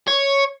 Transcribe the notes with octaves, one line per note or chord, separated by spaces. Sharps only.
C#5